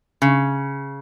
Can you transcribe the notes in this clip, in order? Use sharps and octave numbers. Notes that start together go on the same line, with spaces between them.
C#3